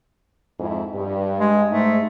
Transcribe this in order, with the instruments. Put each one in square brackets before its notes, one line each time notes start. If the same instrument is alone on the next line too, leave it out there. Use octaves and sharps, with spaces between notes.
[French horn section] F2 G#2 E4
G2
[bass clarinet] G#3
[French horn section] G#2 D#4 [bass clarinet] A3